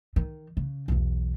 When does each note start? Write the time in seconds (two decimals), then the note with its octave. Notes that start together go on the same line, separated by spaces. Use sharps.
0.16 D#3
0.57 C#3
0.88 B1 E2